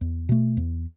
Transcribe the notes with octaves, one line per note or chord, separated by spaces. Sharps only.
E2
B2 A3
E2